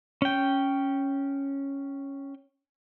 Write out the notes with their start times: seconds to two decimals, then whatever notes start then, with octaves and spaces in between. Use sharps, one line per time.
0.22 C#4 G5